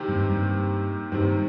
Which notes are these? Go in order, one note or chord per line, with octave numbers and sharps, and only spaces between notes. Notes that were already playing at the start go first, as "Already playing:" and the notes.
Already playing: C3 D#3 A#3 G4 C5
G2
G2
G2 C3 D#3 C4